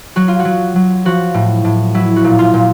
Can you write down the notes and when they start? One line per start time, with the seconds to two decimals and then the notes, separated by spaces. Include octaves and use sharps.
0.16 F#3 F#4
0.28 F4
0.40 F#4
0.45 F#3
0.76 F#3
1.05 F3 F#4
1.34 A2
1.64 A2
1.94 F#3 E4
2.16 F#4
2.24 A#2
2.39 F4
2.54 A#2